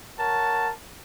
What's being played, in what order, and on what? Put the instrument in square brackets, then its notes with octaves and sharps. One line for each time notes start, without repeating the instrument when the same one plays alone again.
[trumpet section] A#4 C#5 F#5 A5